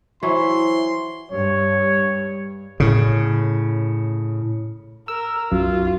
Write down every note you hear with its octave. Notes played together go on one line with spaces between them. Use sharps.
E3 F#3 E4 C5 E5 C6 C#6
G2 C#5
A2 C#3
A#4 E6
B1 F#2 F4 F#4